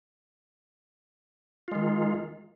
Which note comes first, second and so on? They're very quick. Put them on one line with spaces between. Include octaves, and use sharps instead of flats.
F4 G#3 D#3